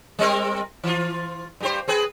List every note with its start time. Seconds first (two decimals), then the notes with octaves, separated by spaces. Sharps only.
0.19 G3 C4 A#4
0.84 E3 F4
1.60 G2 G4 C5
1.88 C4 G#4 B4